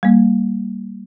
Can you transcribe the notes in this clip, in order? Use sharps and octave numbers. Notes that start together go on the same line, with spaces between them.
G3 A#3